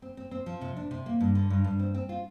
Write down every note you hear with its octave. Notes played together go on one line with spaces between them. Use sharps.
C4
C4
C4
F3
C3
D4
C3
A#3
G2
D3
G2
G2
C4
C4
F4